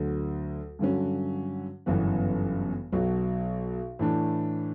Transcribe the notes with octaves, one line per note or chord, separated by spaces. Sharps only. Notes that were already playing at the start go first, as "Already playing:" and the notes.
Already playing: D2 D3 F#3
G2 D3 F#3 C#4
G1 F#2 C#3 E3 B3
B1 B2 F#3
A2 E3 A3 D4